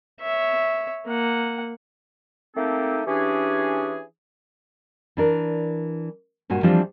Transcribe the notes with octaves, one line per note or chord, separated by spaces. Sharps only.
C#5 E5
A#3 F#5
A3 A#3 C4 D#4 G4 A4
E3 C#4 D4 G4 G#4
E3 D4 A#4
G2 A#2 F#4 G#5
E3 F3 G3 C4 D4 F4